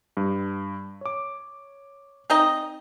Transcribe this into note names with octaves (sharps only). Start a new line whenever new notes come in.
G2
C#5 D6
C4 D#4 D#5